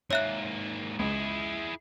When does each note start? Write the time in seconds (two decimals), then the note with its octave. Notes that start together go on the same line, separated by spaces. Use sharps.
0.11 G#2 A#3 C#5 E5 F#6
0.99 C#2 E4 G#4